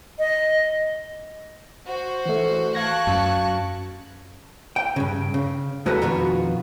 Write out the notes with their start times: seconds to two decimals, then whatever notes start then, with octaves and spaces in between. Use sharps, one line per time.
0.19 D#5
1.86 F#4 C5
2.26 E3 A3
2.75 F5 A5 C#6 F#6 G#6 A#6
3.07 F#2
4.76 G5
4.96 G2 C#3
5.34 C#3
5.86 E2 G#3 F#4 A4 B4 A#5
6.02 F2 B2 D#3 B3 F4 F#4